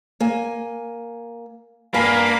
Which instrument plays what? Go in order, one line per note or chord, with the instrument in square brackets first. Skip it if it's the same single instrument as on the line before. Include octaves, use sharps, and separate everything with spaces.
[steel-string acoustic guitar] A#3 G#5
[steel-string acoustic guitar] G2 G#5 A5 [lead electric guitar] A#3 [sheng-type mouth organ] F5 B5